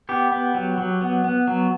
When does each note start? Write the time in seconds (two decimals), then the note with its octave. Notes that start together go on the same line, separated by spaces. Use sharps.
0.09 B3 G4
0.32 B3
0.54 F#3
0.78 F#3
1.01 B3
1.24 B3
1.47 F#3